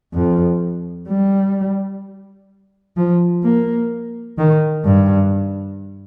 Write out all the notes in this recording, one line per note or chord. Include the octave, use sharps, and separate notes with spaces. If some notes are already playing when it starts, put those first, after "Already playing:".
F2
G3
F3
A#3
D#3
G2